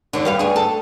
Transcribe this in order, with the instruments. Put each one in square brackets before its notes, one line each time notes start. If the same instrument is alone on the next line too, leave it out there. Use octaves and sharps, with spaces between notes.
[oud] D#2 D3
G3 B4 F5
D2 G#4
A4